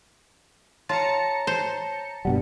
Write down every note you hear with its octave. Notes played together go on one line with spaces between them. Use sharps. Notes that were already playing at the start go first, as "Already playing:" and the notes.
F4 C#5 A5 A#5 C#7
C5
G2 B2 G3 F#5